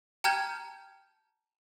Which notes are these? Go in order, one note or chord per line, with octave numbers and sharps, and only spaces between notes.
G5 A5 A#5 F6 G6 G#6